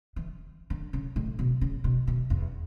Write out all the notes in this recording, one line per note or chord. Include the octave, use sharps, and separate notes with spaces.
E3
D3
C#3
A2
B2
C#3
B2
B2
E2